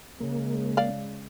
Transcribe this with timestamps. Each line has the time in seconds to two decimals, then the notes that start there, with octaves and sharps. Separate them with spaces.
0.20 C#3 G#3 A#3
0.77 D5 F5